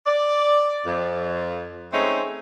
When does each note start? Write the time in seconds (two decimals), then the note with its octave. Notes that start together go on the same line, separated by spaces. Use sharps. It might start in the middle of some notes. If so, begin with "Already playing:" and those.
0.07 D5
0.86 F2
1.93 G#3 A3 C4 C#4 D#4